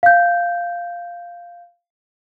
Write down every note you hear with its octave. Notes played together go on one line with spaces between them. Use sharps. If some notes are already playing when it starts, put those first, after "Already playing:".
F5 G6